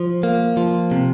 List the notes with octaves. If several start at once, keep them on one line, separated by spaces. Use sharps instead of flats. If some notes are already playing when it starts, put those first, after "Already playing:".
Already playing: F3
A#3
F3
C3